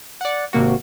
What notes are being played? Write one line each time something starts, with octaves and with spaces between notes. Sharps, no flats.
D5 F#5
G#1 C3 A#3 F#4